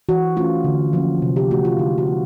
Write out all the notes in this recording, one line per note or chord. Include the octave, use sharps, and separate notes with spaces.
E3 F#4
A3 C#4 F4
D3
F3 A#3 C#4
C3
G4
E3 A3 F#4
F4
D3 E4
F#4
F#3 B3